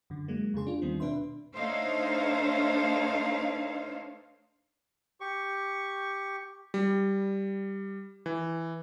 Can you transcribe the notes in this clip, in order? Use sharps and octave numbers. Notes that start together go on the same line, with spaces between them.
F#2 D3
F#3 G#3 A#3
F2 C#3 G#4 C6
D4 F4
D#2 D#3 G3 B3 C4
B2 D4 B4 E5 C6
A3 D4 D#4 C5 C#5 F5
G4 C#6
G3
E3